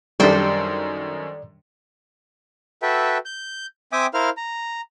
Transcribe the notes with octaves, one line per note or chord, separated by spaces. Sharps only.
F#2 D#3 G3 D4 A4 C5 D5 G5
F#4 A4 B4 E5 G5
G6
C4 E5 G5 G#5 D6 D#6
E4 A#4 C5 F5 F6
A#5